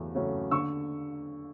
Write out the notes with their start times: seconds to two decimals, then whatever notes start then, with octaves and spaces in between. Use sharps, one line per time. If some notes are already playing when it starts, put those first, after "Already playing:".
Already playing: E2 C#3 F#3 A3 C#4
0.15 C#3 F#3 A3 C#4
0.51 D3 C#6 E6